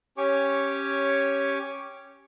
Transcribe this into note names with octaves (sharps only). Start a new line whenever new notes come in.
C#4 G4 C#5 G#5 C#6 D6